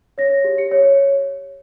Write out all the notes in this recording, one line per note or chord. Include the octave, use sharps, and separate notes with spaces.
C#5 A#6
G4
C#7
C#5